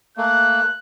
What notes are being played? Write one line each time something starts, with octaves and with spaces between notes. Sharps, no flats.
A3 A#3 F#6